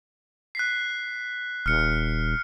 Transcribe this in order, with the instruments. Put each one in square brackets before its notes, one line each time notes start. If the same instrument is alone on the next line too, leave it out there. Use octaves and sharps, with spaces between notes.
[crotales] F#6 B6 C7
[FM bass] D#1 [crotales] F6 C#7